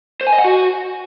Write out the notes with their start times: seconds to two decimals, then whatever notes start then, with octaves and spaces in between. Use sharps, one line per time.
0.21 C5
0.27 G#5
0.33 D#5
0.38 F#5
0.44 F#4